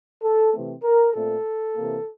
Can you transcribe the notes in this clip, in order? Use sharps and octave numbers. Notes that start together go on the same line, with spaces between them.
A4
C3 E3 A3 C4
A#4
A#2 A3 C4 A4
C3 E3 A#3